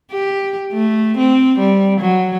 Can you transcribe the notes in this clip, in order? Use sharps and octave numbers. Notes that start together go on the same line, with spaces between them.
G4
A3
C4
G3
F#3